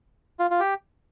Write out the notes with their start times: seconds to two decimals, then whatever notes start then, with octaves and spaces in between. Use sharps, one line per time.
0.39 F4
0.51 F4
0.60 G4